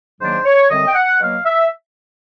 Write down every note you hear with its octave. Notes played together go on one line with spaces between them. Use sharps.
G#2 D#3 F#3 A#3 D4 C5
C#5
F#2 D3 G3 C4 D#5
G5
F#5
B2 F#3 A#3 F5
E5